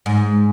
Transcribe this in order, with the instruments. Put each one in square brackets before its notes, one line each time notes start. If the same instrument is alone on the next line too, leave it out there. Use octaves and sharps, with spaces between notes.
[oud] G#2